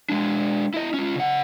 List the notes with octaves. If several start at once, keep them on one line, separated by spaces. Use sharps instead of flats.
G#3 D4
E4 D#5
C#4 F4
C#3 F#5